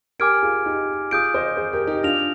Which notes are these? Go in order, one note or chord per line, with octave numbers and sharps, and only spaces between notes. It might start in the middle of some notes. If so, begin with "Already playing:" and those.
G4 A#4 G#5 D6 F6 G#6 D7
F4 G#4
D#4 G4
F4 G#4 D#6 G6 D7
C5 D#5
G#4 C5
G4 A#4
D#4 G4
D4 F4 F6 A#6 F7